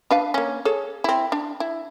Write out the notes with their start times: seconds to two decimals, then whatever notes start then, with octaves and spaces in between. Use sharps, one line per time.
0.11 D4 B4 F5
0.34 A#3 C#4
0.65 G#4 A4 C#5
1.04 C4 E4
1.32 D4
1.60 E4